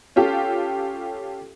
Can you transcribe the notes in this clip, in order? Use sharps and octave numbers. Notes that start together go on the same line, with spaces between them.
C#4 F4 G4 A4